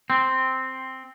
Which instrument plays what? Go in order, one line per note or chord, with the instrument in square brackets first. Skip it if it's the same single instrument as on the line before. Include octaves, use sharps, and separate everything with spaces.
[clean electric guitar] C4